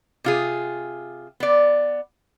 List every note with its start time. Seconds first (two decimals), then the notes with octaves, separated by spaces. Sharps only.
0.24 C3 F4 G#4
1.40 B3 D5